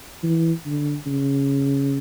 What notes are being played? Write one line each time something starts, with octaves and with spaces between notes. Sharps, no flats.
E3
D3
C#3